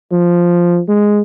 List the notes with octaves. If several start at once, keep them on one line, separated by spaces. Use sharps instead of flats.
F3
G#3